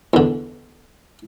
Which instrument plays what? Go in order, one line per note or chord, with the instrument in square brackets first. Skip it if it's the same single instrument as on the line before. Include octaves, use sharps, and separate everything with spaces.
[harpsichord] E2 D3